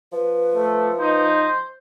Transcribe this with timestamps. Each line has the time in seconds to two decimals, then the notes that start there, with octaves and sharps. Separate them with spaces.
0.12 F3 B4
0.55 A3
0.99 D#4 C5